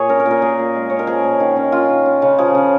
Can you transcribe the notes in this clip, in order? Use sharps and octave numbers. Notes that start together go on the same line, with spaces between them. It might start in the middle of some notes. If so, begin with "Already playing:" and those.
Already playing: A#2 G#4 C#5
C#4 A#4
A#4
A#2
A#4
A#3 G#4
A#2
G#3
C#4 C#5
A#4
F3 G#4
A#2
D#3
C#4
C#4 F4
D#3
C#4
C#3
F3 G#4
C#3